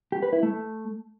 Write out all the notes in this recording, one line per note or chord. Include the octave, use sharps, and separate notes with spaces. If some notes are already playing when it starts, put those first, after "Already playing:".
G4
B4
E4
A3